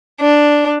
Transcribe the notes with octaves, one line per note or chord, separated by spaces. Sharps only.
D4